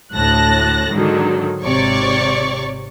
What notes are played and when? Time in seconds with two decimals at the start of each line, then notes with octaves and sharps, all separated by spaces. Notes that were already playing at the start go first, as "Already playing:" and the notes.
0.13 D2 A2 A5 F#6 A#6
0.93 G#2 D3 D#3 F#3
1.63 G#1 C3 C#5 D5 C#6